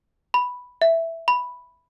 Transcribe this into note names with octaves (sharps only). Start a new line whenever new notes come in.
B5
E5
B5